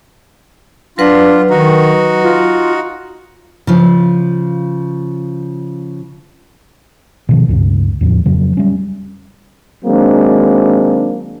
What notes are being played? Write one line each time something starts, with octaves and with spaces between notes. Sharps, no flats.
F#3 D4 F4 B4 F#5
D#3 D#4 F#4
F4
C#3 F3
B2 D#3 F3
C#2 G2 C#3
E2 A2 F3
F2 C#3 F#3
G3 C#4
D#3 F#3 G#3 A#3 C4 D4